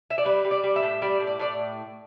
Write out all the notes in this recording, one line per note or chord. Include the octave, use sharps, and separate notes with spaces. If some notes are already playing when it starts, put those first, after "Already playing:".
E5
D5
G3 B4
G3
D5
G3
E5
A2
G3 D5
A2
D5
A2 D5